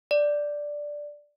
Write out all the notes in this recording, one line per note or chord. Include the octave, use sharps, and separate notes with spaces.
D5